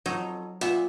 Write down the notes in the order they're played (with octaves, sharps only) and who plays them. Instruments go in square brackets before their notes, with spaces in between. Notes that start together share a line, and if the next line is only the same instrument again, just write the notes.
[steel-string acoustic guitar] F2 [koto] F#3 D#4
[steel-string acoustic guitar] A#2 [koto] B3 E5